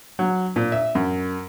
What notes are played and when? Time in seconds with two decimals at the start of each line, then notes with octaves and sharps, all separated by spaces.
0.19 F#3
0.56 A#2
0.72 E5
0.95 F#2